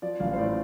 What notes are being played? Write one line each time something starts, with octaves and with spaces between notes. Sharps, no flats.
F3 D5
A1 F5
C5
A2 D5